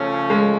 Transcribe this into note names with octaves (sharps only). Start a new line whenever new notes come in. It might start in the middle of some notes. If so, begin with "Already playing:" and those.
Already playing: C#3 F3 A3 C#4
G#3